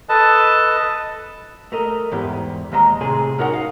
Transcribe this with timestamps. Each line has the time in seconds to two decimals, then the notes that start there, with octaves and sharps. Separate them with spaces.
0.09 A4 B4 D#5 A5
1.72 A3 A#4 D#5
2.12 E2 G#2 E4 G4
2.72 D#2 G#3 D#5 E5 A#5
3.01 A2 C3 G#4 G#5 C6
3.38 C#4 D#4 F#4 A#4 D#5 F#5
3.54 F5